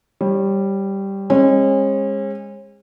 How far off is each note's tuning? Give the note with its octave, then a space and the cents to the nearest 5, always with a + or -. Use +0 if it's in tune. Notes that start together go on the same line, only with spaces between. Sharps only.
G3 +0 C#5 -30
G#3 -30 C#4 -40